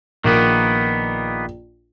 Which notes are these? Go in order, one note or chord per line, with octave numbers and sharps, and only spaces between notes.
A#1 D#3 A#3 B3 A#4